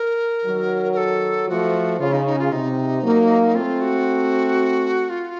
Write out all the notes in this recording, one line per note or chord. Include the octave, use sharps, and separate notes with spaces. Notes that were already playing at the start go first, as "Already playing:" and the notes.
Already playing: A#4
D#3 F#3
A#4
A4
F3 A3 F#4
C#3 F4
D#4
D#4
F4
C3 D#4
F#3 A#3
A3 C4 F4
F#4
F4